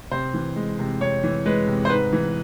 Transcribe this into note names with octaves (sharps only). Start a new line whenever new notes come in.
C3 C5
E3
G#3
C3
C3 C#5
E3
G#3 B4
C3
C5
G#2 B4
E3